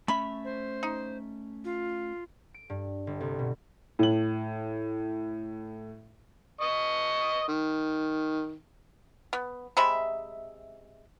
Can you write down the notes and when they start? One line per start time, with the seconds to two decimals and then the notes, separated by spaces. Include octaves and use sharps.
0.08 A3 C#4 E5 B5
0.45 C5
0.83 D#4
1.65 F4
2.54 D7
2.70 G2
3.07 G1
3.20 C2
3.39 B2
3.99 A2 F#7
6.61 D#5 C#6 D#6
7.48 D#3
9.33 B3
9.77 C3 G#3 E5 B5